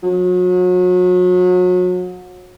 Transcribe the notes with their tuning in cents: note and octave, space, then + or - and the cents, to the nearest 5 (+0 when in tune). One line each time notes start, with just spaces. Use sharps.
F#3 -35